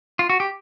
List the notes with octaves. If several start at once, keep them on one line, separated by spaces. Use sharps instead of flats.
F4
F#4
G4